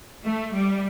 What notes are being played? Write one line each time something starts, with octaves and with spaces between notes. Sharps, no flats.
A3
G3